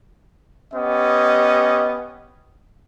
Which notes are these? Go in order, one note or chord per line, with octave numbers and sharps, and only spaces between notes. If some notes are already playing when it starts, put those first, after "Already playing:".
B3 C#4 G4 D#5